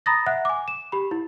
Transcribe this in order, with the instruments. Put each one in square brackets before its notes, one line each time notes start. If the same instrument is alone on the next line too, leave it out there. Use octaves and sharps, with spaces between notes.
[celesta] A#5 B5 D#6 A6 A#6
E5 F#5 F#6
G#5 D6
E7
G4 B5
E4